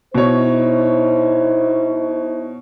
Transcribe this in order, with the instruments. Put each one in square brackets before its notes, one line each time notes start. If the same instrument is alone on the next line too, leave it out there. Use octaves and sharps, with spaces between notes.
[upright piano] B2 C#5 [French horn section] D#4 E4 C5